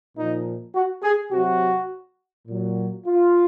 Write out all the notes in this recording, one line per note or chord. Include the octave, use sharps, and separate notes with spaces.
A#2 F3 D#4
F#4
G#4
C3 F#3 F#4
A#2 F#3
F4